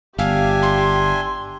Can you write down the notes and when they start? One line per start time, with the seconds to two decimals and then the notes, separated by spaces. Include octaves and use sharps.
0.19 G1 D4 G4 E5 F5 G#5
0.63 C6